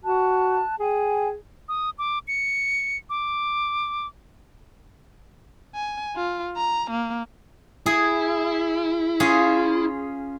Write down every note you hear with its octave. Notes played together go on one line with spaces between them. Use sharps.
F#4 A5 F#6
G#4 G5 G#5
D#6
D6
C#7
D6
G#5
F4
A#5
A#3
E4 G#4
C#4 F4 G#4